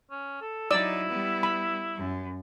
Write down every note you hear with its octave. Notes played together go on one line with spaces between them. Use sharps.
C#4
A4
F#3 D#4 E4 D5 E6
G3 B3
B5
F#2